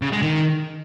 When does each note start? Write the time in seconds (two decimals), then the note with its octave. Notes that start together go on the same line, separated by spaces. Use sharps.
0.02 C#3
0.12 G#3
0.23 D#3